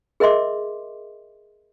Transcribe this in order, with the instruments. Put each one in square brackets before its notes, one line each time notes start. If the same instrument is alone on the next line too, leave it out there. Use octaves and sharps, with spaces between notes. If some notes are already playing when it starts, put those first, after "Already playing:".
[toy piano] G#4 A#4 D#5 E5 C6 D6